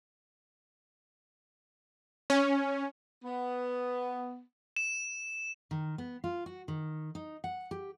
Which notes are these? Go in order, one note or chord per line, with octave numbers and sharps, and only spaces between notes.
C#4
B3
E7
D#3
B3
F4
F#4
D#3
D#4
F#5
G4